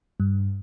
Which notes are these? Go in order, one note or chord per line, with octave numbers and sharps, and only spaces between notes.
G2